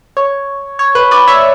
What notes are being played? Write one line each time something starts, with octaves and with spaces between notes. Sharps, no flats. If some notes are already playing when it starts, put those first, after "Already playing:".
C#5
C#5
B4
B4 D5
C#5 E5